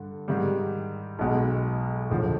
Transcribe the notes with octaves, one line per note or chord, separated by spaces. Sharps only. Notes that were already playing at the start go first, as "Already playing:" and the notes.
Already playing: G2 D3
G#2 D#3 G3
B1 B2 G#3
E1 D#2 D3 F3